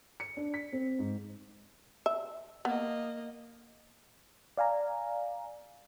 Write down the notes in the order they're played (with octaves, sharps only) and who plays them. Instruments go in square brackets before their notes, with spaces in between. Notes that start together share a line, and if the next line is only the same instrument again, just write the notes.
[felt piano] C#7
D4
B6
C4
G#2
[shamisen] E5
[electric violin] A#3 D#5 [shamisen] B3
[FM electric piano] D5 F5 G#5 A#5